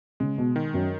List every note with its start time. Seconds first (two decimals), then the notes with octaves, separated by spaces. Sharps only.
0.20 C#3 G#3
0.38 B2
0.56 D#3
0.74 F#2